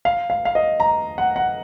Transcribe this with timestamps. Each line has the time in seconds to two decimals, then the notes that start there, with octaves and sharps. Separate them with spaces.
0.05 F5
0.30 F5
0.45 F5
0.55 D#5
0.80 A#5
1.18 F#5
1.36 F#5